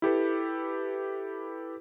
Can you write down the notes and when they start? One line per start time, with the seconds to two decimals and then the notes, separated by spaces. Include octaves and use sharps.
0.02 E4 G4 A4 B4